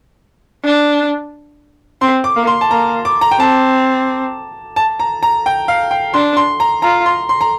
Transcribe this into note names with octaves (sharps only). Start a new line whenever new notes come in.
D4
C4 C6
D6
A#3
C6
A5
A#3 A#5
D6
A#5
G5
C4 A5
A5
A#5
A#5
G5
F5
G5
D4 C6
C6
A#5
F4 A#5
C6
C6
A#5